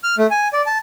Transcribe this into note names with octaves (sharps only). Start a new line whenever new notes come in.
F6
A3
G#5
D5
A5